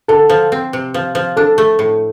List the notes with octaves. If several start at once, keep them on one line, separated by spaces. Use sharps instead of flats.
D3 A4
F3
C4
C3
F3
F3
D4 A4
A3
A2